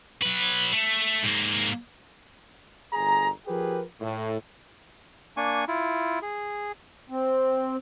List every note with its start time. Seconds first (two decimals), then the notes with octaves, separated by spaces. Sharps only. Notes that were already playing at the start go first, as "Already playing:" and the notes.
0.22 F#3 B4
0.72 A3
1.23 G#2 A#3
2.93 G1 G#4 A#5
3.47 F3 G4 G#4 A#4 B4
4.01 A2
5.37 A#3 D4 G#5 C#6
5.68 E4 F4
6.22 G#4
7.10 C4